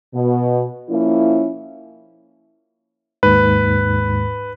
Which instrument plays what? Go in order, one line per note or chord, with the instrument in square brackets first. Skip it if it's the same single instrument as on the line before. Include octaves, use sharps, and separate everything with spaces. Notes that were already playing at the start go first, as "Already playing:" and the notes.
[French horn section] B2
F3 A#3 C#4 E4
[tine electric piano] D#2 G#2 [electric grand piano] B4